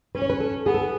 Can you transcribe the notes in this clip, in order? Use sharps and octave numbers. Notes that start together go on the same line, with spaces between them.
C#4 B4
C#5
B4
A4
B3 G#4
A4
G#4